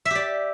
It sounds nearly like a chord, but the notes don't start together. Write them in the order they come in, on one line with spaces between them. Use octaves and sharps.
E5 G4 D5